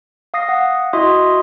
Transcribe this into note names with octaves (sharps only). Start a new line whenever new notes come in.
F5 D#6 A#6 C7
F#5
E4 F#4 D#5 E5 C6 D#6